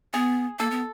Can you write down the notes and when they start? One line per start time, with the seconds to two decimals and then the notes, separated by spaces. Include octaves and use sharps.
0.14 B3 G#4
0.59 A#3 A4
0.71 B3